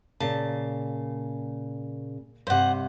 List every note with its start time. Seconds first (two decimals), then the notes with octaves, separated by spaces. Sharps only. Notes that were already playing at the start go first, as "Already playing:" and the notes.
0.20 A#2 C#3 A5
2.47 G2 C3 C5 F#5